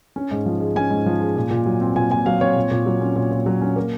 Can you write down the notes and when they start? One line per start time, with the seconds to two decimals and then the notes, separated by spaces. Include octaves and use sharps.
0.16 C#4
0.31 G#2
0.46 F3
0.61 G#3
0.76 C#4 G#5
0.91 G#2
1.06 F3
1.21 G#3
1.36 A#2
1.51 A#2
1.66 F#3
1.81 C4
1.95 A#2 G#5
2.10 A#2 G#5
2.26 F#3 F5
2.41 C4 C#5
2.56 A#2
2.71 A#2
2.86 F#3
3.01 C#4
3.16 A#2
3.31 A#2
3.46 F#3
3.62 C#4
3.76 A#3